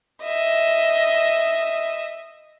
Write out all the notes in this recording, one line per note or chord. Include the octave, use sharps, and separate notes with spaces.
D#5 E5